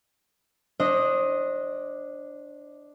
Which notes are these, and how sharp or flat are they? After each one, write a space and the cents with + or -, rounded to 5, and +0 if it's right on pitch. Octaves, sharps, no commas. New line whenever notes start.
D4 +0 C5 +35 D#5 +0